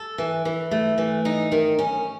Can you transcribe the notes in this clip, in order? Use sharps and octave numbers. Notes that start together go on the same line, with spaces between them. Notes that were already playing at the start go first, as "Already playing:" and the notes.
Already playing: A4
E3
E3
A3
E3
D#4
D#3
C#4